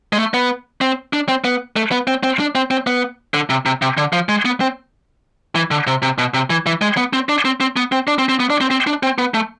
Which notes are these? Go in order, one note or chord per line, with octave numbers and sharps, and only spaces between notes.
G#3
A3
B3
C4
D4
C4
B3
A3
B3
C4
C4
D4
C4
C4
B3
D3
C3
C3
C3
D3
F3
G#3
B3
C4
E3
D3
C3
C3
B2
C3
E3
E3
G#3
B3
C4
D4
C4
C4
B3
C4
D4
C4
C4
B3
D4
C4
C4
D4
C4
B3
A3